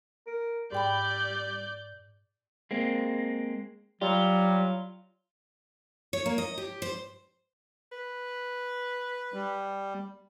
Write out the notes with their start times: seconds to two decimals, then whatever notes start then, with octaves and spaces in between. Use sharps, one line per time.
0.27 A#4
0.72 G#2 G3 D5 G5 B5 G6
2.71 G#3 A#3 C4
4.02 F#3 G3 F4
6.13 C#5
6.26 A#3
6.38 D#5
6.58 G4
6.82 C5
7.92 B4
9.34 G3